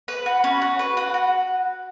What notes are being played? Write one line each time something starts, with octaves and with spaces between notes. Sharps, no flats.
B4
F#4
C#4
F#4
B4
F#4
F#4